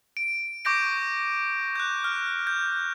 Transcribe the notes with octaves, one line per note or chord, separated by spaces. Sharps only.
D7
C#6 D6 G6 A#6 D7
F#6 G6
F6
G6